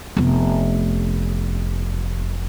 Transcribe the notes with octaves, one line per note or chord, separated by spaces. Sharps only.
F1 B3